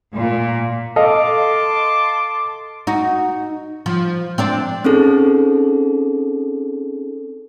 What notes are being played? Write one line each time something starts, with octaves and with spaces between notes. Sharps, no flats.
A#2
A4 D#5 F5 A5 C6 D6
D#4 F#4
F3
C4 D4 D5
C4 C#4 D#4 G#4 A4